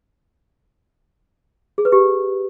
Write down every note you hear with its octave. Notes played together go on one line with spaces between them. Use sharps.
G#4
B4
G4